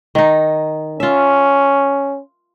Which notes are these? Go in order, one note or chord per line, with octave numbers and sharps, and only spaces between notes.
D#3 D#4
C#4 F4 E5